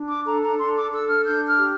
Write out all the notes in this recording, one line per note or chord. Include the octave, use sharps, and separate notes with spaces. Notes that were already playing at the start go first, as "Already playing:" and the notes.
Already playing: D4
D6
A4 A#5
A#5
D4 C6
D6
A4 E6
F6
D4 G6
F6
G4